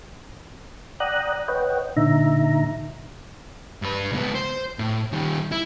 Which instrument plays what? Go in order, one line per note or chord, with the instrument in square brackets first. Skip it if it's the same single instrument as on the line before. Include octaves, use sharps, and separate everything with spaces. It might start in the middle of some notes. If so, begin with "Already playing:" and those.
[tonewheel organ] D5 F#5 G5 A#5 D#6 F#6
B4 C#5 D#5 F#5 G5
A#2 D3 D#4 E5 A#5
[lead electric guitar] G2 B4
C#2 B3
C5
A2
D#3 G3
E4